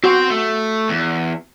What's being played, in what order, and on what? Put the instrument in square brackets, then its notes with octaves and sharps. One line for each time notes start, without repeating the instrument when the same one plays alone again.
[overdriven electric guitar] C4 C5 [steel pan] F#4
[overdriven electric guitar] A3
E2